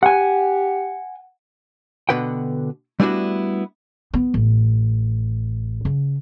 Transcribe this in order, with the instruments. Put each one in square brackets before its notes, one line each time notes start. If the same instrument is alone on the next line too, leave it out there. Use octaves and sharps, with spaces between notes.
[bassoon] G4 [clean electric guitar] F#5 G#5
[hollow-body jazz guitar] B2 D3 B4 F#5 G5
G3 A3 B3 D4 E4 F#4
[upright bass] B3
A1
C#3